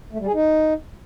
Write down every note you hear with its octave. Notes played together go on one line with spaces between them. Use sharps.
A3
G3
G#4
D#4